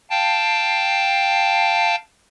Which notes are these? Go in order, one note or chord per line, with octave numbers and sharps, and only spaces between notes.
F5 G5 A5